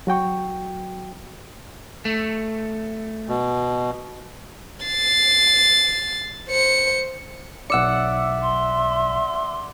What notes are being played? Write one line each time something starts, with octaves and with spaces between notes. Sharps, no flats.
F#3 F#4 G5 C#6
A3
B2
A6 C7
C5 C#7
B1 D5 E5 F#5 E6 C#7
C6